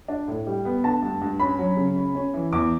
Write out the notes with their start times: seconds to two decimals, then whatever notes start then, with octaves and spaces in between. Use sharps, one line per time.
0.08 D4
0.28 A2
0.47 G3
0.65 B3
0.84 D3 A5
1.02 G2
1.21 G2
1.40 C#4 B5
1.59 F#3
1.77 C#3
1.96 C#4
2.15 C#4
2.34 E3
2.53 E2 D6